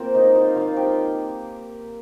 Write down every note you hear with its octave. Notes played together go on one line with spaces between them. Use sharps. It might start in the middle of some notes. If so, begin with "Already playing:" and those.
Already playing: A#3 C4 F4 A#4 C5
D#3 D#4 D#5
F4 F5
F3 F4 F5
G4 G5